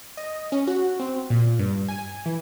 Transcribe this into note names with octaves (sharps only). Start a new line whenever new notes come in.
D#5
C#4
F#4
C4
A#2
G2
G#5
E3